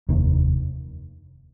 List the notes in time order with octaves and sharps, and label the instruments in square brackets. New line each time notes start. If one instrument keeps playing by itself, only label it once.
[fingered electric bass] F1 D#2 D#3